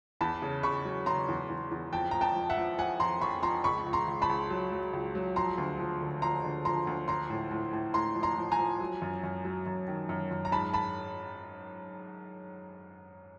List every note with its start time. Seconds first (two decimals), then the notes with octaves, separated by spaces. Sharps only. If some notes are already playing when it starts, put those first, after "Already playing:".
0.21 E2 A5 B5
0.42 C#3
0.63 C#3 B5 C#6
0.85 F#3
1.06 C#3 A#5 C6
1.28 E2
1.49 E2
1.71 E2
1.93 F2 G5 A5
2.11 F3 A#5
2.21 G5 A5
2.36 F3
2.49 E5 F#5
2.57 F3
2.79 F3 F#5 G#5
3.00 F2 A#5 C6
3.21 F2 B5 C#6
3.43 F3 A#5 C6
3.64 C#2 B5 C#6
3.86 C#2
3.93 A#5 C6
4.07 C#2
4.22 A5 B5
4.29 C#2
4.50 F#3
4.72 F#3
4.93 C#2
5.15 F#3
5.36 F3 A#5 C6
5.58 D2
5.79 F3
6.01 D3
6.22 F3 A#5 C6
6.44 D3
6.65 F3 A#5 C6
6.87 D2
7.08 F3 A#5 C6
7.30 A2
7.51 A2
7.73 A2
7.94 A2 A#5 C6
8.15 F3
8.23 A#5 C6
8.37 F3
8.52 G#5 A#5
8.59 F3
8.80 F#3
9.02 F#2
9.23 F#2
9.45 F#3
9.66 F#2
9.88 D#3
10.09 F#2
10.31 F#2
10.45 A#5
10.52 G#2 A5 B5
10.73 A5 B5